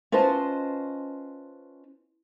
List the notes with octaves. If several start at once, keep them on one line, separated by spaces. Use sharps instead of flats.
C#4 F4 B4 C5 D#5 A5